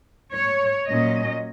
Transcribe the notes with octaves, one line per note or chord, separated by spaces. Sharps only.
C#5
A#2 F#3 C#4 D#5